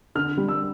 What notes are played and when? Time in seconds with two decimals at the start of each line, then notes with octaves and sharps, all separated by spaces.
0.15 D3 F6
0.37 G3
0.48 E6